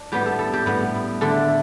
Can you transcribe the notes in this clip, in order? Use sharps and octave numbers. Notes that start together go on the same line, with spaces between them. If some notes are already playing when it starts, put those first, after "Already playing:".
Already playing: D4
A2 G3 B3 G4
A4
A4
G4
A2 G3 B3
D3 A3 D4 A4